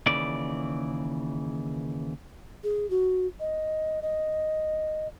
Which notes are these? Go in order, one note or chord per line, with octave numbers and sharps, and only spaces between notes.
D#2 C#3 E3 D5
G#4
F#4
D#5
D#5